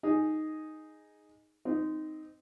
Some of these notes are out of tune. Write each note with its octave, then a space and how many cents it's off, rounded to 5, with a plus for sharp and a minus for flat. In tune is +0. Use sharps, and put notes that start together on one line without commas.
D#4 +0 G#4 +0
C4 -20 D#4 +0